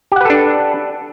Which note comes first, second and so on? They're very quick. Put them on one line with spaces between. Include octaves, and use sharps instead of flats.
G4 F#5 B4 A4 D4